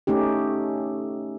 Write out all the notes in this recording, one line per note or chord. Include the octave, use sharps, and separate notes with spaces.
A3 C#4 D#4 G4